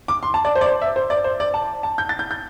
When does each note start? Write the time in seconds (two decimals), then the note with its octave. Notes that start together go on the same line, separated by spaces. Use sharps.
0.08 D6
0.23 C6
0.34 A5
0.45 D5
0.55 C5
0.61 D5
0.66 C5
0.82 E5
0.96 C5
1.10 D5
1.24 C5
1.40 D5
1.54 A5
1.83 A5
1.98 G6
2.09 A6
2.19 G6
2.31 G6